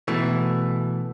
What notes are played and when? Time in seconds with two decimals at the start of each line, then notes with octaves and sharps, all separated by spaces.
0.08 B2 E3 A3